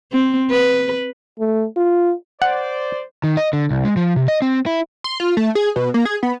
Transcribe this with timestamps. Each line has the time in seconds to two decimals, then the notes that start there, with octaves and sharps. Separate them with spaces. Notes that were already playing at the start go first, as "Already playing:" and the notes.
0.12 C4
0.50 B4
1.39 A3
1.77 F4
2.42 C5 D5 F#5
3.24 D#3
3.37 D#5
3.53 D3
3.71 C2
3.85 G#3
3.97 F3
4.16 C3
4.28 D#5
4.42 C4
4.66 E4
5.04 C6
5.20 F4
5.37 A3
5.55 G#4
5.76 B2
5.94 A#3
6.05 G#4
6.23 B3